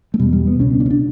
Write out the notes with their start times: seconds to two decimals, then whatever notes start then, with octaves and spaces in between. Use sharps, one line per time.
0.14 A3
0.19 E2 B2 G3
0.33 G3
0.47 B3
0.60 C#2 B2 C#4
0.70 D4
0.80 D4
0.86 C#4
0.90 D4